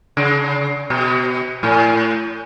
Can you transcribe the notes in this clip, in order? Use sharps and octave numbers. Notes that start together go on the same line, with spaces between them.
C#3
B2
A2